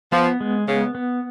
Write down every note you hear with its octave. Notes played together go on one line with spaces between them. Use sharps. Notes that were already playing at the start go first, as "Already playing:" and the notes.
F3 B3
G#3
C#3 B3
B3